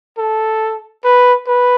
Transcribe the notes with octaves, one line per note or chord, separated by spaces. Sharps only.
A4
B4
B4